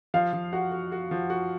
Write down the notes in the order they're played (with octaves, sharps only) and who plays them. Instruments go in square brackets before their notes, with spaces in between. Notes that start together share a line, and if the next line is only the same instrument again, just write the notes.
[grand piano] F3 [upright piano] F5
[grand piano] F3
[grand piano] F#4 [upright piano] F#5
[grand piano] F#4
F#4
F3
F#4